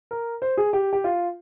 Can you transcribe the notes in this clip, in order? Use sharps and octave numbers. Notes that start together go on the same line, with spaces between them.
A#4
C5
G#4
G4
G4
F4